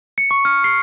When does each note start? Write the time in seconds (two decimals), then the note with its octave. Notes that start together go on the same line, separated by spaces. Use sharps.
0.18 C#7
0.31 C#6
0.45 F6
0.64 C7